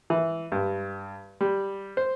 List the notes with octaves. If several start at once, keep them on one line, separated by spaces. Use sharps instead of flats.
E3
G2
G3
C5